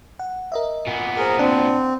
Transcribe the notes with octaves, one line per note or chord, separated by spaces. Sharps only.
F#5
A#4 D#5 E5
A#2 B3
G#4 A#4 C5 F#5
C4 D4